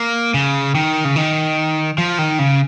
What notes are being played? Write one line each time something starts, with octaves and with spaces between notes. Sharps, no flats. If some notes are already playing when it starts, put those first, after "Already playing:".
Already playing: A#3
C#3
D#3
C#3
D#3
F3
D#3
C#3